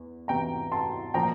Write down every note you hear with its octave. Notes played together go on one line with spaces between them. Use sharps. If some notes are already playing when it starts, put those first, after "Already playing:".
Already playing: E2
E2 C3 E3 G5 A#5
A5 C6
A#2 F3 G5 A#5